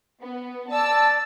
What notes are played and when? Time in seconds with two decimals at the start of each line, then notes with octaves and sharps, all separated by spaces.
0.21 B3
0.70 D5 A5 E6